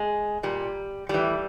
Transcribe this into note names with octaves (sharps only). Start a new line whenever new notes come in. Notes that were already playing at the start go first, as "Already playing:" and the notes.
Already playing: G#3
A#2 G3
A2 E3 G3